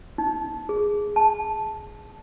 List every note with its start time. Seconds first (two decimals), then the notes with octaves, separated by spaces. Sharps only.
0.18 D#4
0.69 G#4
1.16 A5